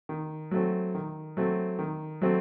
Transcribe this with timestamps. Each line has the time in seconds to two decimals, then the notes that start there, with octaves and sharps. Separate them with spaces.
0.09 D#3
0.51 F#3 A3 C4
0.95 D#3
1.37 F#3 A3 C4
1.79 D#3
2.22 F#3 A3 C4